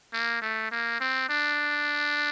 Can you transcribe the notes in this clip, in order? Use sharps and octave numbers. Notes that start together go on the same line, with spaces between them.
A#3
A3
A#3
C4
D4